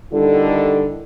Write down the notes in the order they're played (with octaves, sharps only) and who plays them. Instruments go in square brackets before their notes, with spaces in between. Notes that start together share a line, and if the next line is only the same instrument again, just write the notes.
[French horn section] D3 D#3 G3 E4 A4